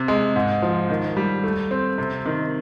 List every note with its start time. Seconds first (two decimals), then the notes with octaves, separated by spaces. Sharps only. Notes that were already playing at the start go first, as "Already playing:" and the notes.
Already playing: C3
0.08 G#3
0.36 G#2
0.62 F3
0.90 D#3
1.17 G3
1.44 A3
1.71 C4
1.98 C3
2.25 D#3